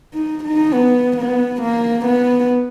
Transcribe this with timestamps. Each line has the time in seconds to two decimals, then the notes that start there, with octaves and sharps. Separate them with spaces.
0.14 D#4
0.44 D#4
0.73 B3
1.17 B3
1.62 A#3
2.06 B3